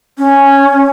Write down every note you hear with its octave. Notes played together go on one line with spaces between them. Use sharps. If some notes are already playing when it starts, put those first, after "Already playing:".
C#4